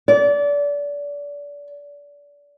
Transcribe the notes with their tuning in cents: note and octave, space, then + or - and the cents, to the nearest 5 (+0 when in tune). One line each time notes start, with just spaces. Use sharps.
D5 -30